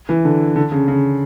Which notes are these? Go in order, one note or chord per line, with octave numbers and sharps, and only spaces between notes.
E3
D3
D3
C#3
C#3